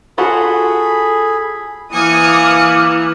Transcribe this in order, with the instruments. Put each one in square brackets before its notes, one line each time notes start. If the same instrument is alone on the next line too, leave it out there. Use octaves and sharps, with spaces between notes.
[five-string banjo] F4 F#4 F#5 [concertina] G#4 B5 [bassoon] A4
[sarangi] E3 [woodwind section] A#3 D6 F6 [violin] G#5 C#7 [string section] D#6